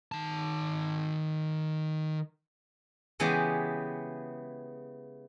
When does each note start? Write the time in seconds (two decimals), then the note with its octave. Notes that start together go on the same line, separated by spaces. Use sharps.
0.12 D#3 A5
3.20 C#3 E3 G#3 B3 G4 G#4